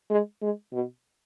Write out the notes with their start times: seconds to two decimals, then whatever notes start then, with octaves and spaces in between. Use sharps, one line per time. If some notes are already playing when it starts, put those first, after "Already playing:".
0.10 G#3
0.42 G#3
0.73 B2